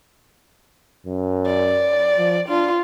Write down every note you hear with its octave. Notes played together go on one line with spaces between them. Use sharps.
F#2
D5
F3
D4 F4